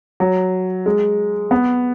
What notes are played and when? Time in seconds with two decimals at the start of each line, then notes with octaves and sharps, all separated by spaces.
0.20 F#3
0.86 G#3
1.51 B3